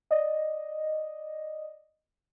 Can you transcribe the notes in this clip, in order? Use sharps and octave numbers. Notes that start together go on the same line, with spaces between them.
D5 D#5